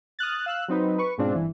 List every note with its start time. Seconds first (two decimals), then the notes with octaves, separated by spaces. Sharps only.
0.19 D#6 F6 F#6 A6
0.46 F5 E6 F#6
0.68 F#3 C4 D#4 B4
0.98 B4 C#6
1.18 G#2 B2 G#3 C4 D4 F4
1.35 G1 E3